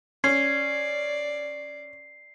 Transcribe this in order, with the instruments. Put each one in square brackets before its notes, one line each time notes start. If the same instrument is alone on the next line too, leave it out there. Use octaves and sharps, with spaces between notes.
[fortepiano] C#4 [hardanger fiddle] D5 [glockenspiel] C7